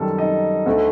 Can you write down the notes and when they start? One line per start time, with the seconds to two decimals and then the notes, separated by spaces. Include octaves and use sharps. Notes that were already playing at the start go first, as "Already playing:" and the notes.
Already playing: F#2 D#3 G3 A4 A5
0.18 D#4 D#5
0.66 D2 D3 A3